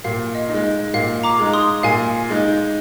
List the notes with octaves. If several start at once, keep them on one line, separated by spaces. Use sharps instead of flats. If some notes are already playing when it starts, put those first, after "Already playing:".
A#2 F5
D#5
G#3 D#4
D#5
A#2 F5
A#5 D6
G#3 D#4
C6 D#6
A#2 F5 G#5
G#3 D#4